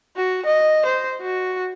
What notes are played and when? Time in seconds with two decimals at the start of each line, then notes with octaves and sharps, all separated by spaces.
0.17 F#4
0.46 D#5
0.86 C5
1.21 F#4